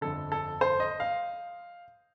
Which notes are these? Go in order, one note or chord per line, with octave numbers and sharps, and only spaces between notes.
G1 F2 D3 A4
A4
C5
D#5
F5